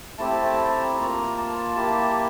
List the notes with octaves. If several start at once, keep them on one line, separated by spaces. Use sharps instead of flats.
A3 C4 E4 G4 A5
A5
A#5
A#3 F4 A#5
A5
A#3 E4 G4 A5